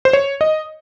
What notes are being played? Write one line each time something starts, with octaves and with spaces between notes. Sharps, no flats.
C5
C#5
D#5